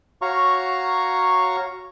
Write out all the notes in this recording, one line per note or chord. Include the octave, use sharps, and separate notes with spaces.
F#4 C#5 F5 A#5 C#6